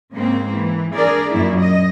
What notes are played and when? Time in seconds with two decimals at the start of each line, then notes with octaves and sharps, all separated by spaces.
0.12 G#2 C#3 A#3 C4
0.51 E3
0.93 D4 G#4 A#4 D5
1.31 F#2 A#2 F#3 E4
1.59 D#5